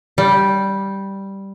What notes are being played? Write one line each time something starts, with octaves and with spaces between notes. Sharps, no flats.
G3